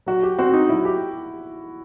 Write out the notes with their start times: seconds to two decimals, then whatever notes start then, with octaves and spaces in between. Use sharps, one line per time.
0.06 F#3 F#4
0.23 G4
0.38 C4 F#4
0.53 D#4
0.69 F#3 E4
0.85 G4